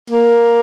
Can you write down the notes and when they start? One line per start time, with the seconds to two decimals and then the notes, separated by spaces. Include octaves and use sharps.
0.10 A#3